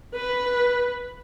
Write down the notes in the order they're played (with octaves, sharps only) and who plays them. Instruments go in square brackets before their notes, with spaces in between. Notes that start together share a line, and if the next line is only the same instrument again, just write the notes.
[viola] B4